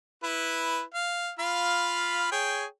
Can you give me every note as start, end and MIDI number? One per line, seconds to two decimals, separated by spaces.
0.23 0.82 64
0.23 0.82 71
0.94 1.30 77
1.39 2.27 65
1.39 2.27 77
1.39 2.27 83
2.32 2.65 68
2.32 2.65 73
2.32 2.65 79